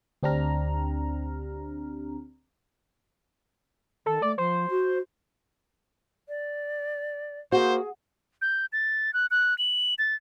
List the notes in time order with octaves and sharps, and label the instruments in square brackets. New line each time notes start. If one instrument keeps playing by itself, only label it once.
[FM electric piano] D2 C4 D4 G4 A#5 F6
[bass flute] D#3 [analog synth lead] A4
[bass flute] A3 [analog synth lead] D5
[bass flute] F3 [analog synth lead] C5
[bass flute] F#4
[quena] D5
[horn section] A#3 C5 [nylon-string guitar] F#4 [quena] G#4
[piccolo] G6
A6
F#6
F#6
F#7
A6